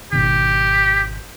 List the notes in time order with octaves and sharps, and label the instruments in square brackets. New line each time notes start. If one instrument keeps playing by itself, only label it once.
[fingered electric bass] G#1 B2 D#3 [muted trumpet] G4